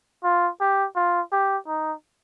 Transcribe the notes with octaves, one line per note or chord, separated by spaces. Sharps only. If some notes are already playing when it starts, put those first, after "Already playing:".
F4
G4
F4
G4
D#4